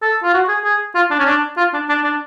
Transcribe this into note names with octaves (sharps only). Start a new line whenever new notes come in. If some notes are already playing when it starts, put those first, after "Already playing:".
A4
F4
F#4
G#4
G#4
F4
D4
C#4
D4
F4
D4
D4
D4